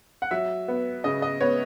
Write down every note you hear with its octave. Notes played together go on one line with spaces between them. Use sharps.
F#5
F#3 E5
B3
C#3 D#5
D#5
B3 C#5